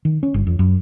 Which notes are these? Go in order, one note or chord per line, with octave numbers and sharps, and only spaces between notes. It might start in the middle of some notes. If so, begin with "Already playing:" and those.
D#3
C#4
G1
F2
F#2